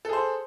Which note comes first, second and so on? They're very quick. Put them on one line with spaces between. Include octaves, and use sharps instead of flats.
A4 G#4 C5